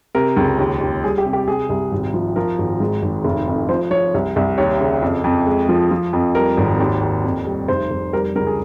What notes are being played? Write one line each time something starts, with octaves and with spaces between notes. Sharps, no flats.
C3 A#4
C#2
D#2
D#2
G3 G#4
G4
C3
G4
C3 G#4
C2
G#1
F3
F3 A#4
G#1
G#2
G#1
F1
F2
F3 C5
F3 C#5
C2
C2
D#2 C#5
C#3
F2
F2
G#3
F3
F3
F2
G3 A#4
G#1
D#2
D#2
F2
G3
F1 C5
F1
G3 A#4
C#2 A#4
G#4